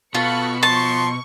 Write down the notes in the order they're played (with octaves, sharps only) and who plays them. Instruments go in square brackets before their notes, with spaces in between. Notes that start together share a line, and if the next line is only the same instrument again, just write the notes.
[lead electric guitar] B2 [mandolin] F4 [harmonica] A4 [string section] B5 C#6 C#7
[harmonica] F3 C6 [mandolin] A5 [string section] C#6